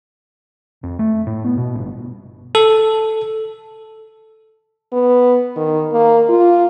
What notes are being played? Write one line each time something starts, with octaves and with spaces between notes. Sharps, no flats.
F2
A3
A2
B3
B2
G1
A4
B3
D#3
A#3
F4